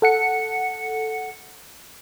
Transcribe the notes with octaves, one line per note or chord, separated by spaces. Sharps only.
A4 F#5 C#7